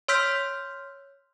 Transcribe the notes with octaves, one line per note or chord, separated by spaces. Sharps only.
C#5 C6 E6 F6 G6 B6